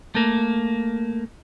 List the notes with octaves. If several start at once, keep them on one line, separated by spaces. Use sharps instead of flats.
A3 A#3